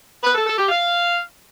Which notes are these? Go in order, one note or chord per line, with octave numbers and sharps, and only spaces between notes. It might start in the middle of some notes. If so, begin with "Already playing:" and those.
B4
A4
A4
G4
F5